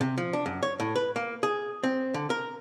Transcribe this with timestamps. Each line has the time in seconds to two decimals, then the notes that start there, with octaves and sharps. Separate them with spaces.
0.01 C3
0.18 F3
0.33 D4
0.46 F#2
0.63 C#5
0.80 A2
0.96 B4
1.16 A#3
1.43 G#4
1.84 C4
2.14 D3
2.30 A#4